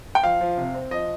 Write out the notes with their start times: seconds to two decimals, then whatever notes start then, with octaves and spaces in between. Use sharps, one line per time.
0.15 G5
0.23 F3 F5
0.41 F3
0.57 C3
0.74 C4
0.91 F3 D#5